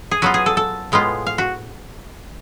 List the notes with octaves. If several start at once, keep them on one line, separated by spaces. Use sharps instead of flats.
G#4
F#3 B3 F4 F#4
G#4
A4
A4
A2 G#3 B3 F4
F5
F#4